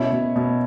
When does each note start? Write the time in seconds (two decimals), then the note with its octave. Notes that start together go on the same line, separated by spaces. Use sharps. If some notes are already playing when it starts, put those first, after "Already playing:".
Already playing: B2 C#4 E4
0.12 B2
0.36 B2